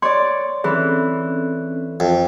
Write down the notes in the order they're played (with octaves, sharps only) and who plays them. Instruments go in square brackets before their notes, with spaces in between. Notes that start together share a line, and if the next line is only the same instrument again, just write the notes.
[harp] C#5 D5 [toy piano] C6
[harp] E3 [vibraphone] C4 C#4 A4 [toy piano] G#4
[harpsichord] F2